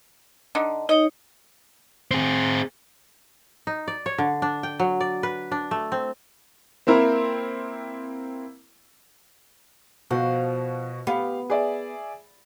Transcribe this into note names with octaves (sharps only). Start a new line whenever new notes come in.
D3 D4 D#4
D#4 C#5 D#5
C4 G#4
D#4
D5
C#5
D3
D4
G5
F#3
D5
B4
D4
A3
C4
A#3 C4 E4 A#4
B2 F3 F#4
B3 G4 F5
G#4 D5 E5